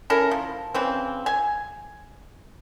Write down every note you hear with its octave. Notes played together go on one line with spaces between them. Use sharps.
C#4 E4 A4 A#4
F3
C#3 E3 C4
G#5